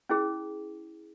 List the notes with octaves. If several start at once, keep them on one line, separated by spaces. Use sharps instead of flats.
C#4 E4 G#4